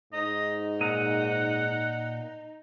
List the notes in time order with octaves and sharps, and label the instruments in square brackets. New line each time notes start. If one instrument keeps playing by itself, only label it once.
[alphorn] G#2 [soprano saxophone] D#4 [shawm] D#5
[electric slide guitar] A#2 D#5 A#5 [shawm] F#5